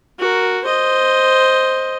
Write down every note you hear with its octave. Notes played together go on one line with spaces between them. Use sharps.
F#4 A#4
C5 D#5